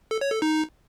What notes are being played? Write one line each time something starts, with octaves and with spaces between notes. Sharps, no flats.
A4
C#5
A4
D#4